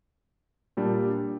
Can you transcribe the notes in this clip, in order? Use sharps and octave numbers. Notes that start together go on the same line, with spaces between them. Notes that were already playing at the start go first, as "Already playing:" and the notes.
A#2 G3 D4